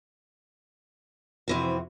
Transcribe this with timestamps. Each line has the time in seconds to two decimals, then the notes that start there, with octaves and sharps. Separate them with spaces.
1.48 F2 C3 E3 C4 F#4